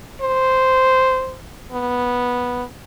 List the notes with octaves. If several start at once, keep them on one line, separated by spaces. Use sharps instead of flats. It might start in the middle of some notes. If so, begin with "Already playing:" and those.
C5
B3